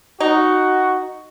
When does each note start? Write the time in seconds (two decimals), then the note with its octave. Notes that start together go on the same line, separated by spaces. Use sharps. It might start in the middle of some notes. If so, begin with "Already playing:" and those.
0.20 D#4 F#4